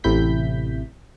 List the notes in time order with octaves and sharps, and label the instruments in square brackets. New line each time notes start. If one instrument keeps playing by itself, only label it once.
[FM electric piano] A1 A2 C3 E4 G6 B6